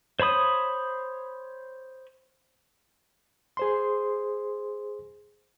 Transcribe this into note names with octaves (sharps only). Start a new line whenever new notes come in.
C5 C#5 B5 D#6
G#4 C5 C6